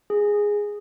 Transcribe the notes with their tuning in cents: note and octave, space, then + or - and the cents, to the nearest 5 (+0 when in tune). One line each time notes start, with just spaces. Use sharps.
G#4 -5